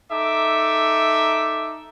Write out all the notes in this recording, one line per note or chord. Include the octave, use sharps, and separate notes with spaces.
D#4 A4 E5 D6